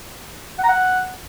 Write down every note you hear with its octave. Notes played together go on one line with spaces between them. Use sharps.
F#5
A#5
F#5